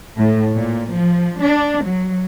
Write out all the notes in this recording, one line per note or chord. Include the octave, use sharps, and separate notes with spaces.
A2
A#2
F3
D4
F#3